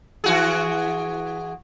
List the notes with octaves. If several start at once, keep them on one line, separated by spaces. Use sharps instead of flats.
E3 F#4 G#4